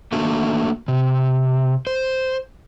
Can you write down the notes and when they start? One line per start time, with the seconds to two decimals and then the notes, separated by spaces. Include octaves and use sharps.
0.12 A3 A#3 D4 F#4
0.88 C3
1.87 C5